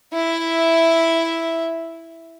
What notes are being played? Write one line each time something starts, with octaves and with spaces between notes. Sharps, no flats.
E4 E5